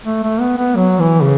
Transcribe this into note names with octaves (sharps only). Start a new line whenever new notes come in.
A3
A3
B3
B3
F#3
E3
C#3